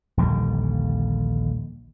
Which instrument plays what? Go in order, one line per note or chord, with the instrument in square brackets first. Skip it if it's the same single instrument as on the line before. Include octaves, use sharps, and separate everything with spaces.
[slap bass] A#1 D#2 D3 G3